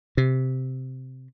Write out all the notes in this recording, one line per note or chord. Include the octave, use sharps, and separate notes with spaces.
C3